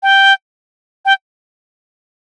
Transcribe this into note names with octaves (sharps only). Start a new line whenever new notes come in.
G5
G5